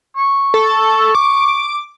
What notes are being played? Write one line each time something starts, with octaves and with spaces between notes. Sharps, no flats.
C#6
A4
D6